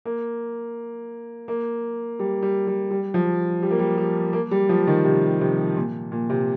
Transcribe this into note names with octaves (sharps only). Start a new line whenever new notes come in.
A#3
A#3
G3
G3
G3
G3
F3
G3
A#3
G3
G3
A#3
G3
F3
D#3
C3
C3
A#2
A#2
C3